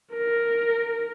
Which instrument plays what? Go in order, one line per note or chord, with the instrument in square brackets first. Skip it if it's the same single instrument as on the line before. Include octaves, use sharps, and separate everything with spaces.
[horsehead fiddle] A#4